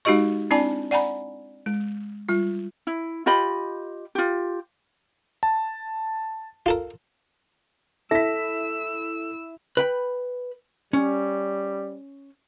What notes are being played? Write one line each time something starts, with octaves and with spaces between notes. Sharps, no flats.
G#3 D#4 F#4 G4 D#5 C#6
C4 D4 E4 D5 G#5 A5
D5 F#5 G#5 A#5 B5
G#3
G3 F4
E4
F4 G4 D#5 B5
F4 G4
A5
F4 A4 A#4
E4 A4 E5 E6 B6
B4 G5 B5
G3 C#4